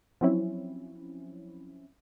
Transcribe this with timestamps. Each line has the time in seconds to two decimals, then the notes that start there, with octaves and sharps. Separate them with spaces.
0.21 F3 F#3 C4 C#4 E4